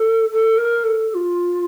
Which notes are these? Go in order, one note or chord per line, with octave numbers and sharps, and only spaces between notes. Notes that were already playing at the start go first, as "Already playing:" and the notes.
Already playing: A4
A4
A#4
A4
A4
F4